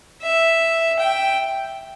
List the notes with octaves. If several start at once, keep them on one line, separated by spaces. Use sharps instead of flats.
E5
G5